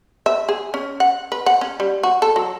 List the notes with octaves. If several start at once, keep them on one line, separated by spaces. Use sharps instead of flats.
E5
G#4
C#4
F#5
B4
F#5
C#4
G3
F#4
A4
F#3